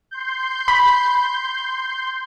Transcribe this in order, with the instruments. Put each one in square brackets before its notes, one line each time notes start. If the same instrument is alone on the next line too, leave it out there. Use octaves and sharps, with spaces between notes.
[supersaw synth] C6 G6
[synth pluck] B5